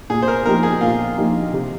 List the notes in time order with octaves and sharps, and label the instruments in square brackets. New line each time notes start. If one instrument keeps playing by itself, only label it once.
[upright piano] A#2 [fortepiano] G#4
[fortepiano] C5
A#4
[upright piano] F3 A#3 D#4 G4 [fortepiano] A#4
[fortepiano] G#4
[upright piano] A#2 [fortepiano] F4
[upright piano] F3 A#3 D#4 G4
C3